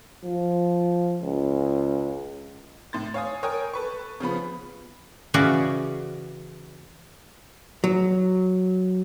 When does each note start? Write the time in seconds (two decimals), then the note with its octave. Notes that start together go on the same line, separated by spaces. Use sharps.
0.25 F3
1.22 C#2
2.93 A2 C6 A6
3.14 C#5 F5 G#5 D#6
3.43 A#4 C#5 G5 G#5 D#6
3.74 A4 B4 C#6
4.20 C#3 F3 B3 B5
5.34 C#3 E3 C#4 F#4 G#4 D5
7.84 F#3